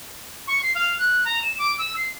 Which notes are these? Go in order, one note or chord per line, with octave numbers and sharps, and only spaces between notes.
C#6
C7
F5
F#6
A#5
E7
D6
E6
C7